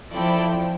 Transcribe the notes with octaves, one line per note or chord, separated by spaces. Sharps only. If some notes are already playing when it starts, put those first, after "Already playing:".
F3 C4 E4 A4 D5 G5